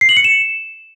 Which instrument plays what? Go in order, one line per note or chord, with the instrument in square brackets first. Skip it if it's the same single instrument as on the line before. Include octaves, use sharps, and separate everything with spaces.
[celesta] C7
F#7
C#7
E7